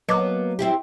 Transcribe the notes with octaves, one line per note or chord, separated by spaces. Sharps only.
F#3 A#3 B3 D#5 A5 D6
C4 E4 G4